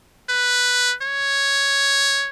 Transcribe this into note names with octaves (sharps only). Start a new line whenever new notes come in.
B4
C#5